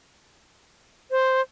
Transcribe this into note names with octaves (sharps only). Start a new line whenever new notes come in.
C5